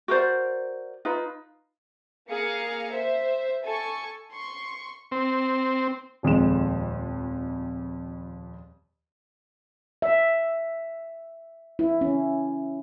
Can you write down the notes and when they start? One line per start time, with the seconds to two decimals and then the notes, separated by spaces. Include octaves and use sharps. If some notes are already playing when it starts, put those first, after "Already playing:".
0.08 F#4 A#4 C5 D5
1.05 D#4 F4 B4
2.29 A#3 G#4 F5 C#7
2.92 C5 E5
3.64 A4 G#5 C#6
4.33 C6 C#6
5.12 C4
6.23 D#1 F2 G#3 E7
10.02 E5
11.79 E4
12.01 C#4